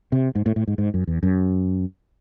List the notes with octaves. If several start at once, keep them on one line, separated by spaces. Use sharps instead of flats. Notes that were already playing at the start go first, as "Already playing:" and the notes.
C3
G#2
A2
A2
G#2
G#2
F#2
E2
F#2